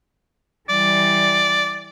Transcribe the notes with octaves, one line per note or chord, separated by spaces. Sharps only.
E3 G3 D5